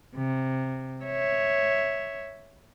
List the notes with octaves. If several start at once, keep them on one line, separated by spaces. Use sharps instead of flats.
C3
C#5 E5